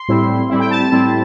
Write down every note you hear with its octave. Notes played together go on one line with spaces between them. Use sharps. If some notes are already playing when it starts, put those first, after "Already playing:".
Already playing: C6
A2 G3 C4 E4
A2 G3 C4 E4
G5
A5
A2 G3 C4 E4